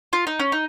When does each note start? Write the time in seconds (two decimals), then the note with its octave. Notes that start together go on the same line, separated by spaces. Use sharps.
0.13 F4
0.27 D#4
0.39 C#4
0.52 D#4